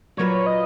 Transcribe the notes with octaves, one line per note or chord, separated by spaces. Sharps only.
A#2 F#3 A#3 F4 B4 C#5
D#5